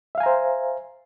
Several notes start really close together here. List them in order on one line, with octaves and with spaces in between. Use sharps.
E5 F5 G#5 A#5 C5